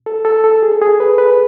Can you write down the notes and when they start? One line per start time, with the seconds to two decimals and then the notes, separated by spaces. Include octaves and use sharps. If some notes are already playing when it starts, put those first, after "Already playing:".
0.06 A4
0.25 A4
0.44 A4
0.63 G#4
0.72 A4
0.81 G#4
1.00 B4
1.18 B4